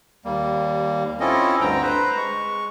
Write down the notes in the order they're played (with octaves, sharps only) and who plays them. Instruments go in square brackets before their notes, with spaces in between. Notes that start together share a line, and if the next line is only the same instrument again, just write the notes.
[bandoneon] D#2 G3 A#3
C4 C#4 E4 F4 A4 D#5
D2 G2 D3 C4 G5 A#5
B4 C5 A#5
G#3 C#6